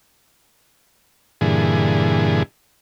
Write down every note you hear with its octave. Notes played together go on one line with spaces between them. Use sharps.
G2 A#2 D3 E3 G#4